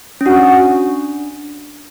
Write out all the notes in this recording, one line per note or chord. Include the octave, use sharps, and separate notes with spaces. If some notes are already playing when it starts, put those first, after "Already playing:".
C#4
D4 F#4